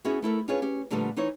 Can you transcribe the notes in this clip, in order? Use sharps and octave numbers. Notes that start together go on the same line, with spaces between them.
B3 C#4 E4 F#4 G#4
A3 E4 A4 A#4
C#4 D4 F4 G#4 B4 C#5
C#4 G4
A#2 D3 F3 G3 A3 B3
E3 D#4 E4 C5 C#5